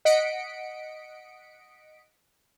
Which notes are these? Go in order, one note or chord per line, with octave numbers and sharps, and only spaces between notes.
D#5 F#5 B6 C#7 D7